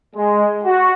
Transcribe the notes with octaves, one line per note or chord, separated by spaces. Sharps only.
G#3
F#4